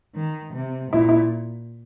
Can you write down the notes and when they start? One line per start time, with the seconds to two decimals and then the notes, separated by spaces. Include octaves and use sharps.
0.15 D#3
0.54 C3
0.92 A#2 E4
1.09 E4